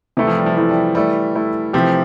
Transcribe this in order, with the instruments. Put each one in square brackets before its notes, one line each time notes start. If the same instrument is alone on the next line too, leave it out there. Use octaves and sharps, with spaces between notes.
[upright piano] C3 [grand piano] E3 A3 E4
[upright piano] F3
G3
F3
[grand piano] E3 A3 E4
[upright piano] G3
[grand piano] E3 A3 E4 [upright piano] G3
[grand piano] E3 A3 E4
[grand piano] C3 E3 A3 C4 G4 [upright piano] F3